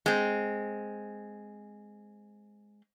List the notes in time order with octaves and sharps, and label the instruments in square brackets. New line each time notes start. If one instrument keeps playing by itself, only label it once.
[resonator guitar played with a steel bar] G#3 C4